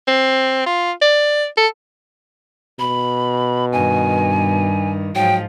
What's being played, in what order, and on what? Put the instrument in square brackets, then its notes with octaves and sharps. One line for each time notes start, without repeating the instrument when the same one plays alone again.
[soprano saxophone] C4
F4
D5
A4
[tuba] B2 [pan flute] B5
[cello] G2 D#3 [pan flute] G#5
[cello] G#2 F3 [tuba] F#3 [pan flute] G5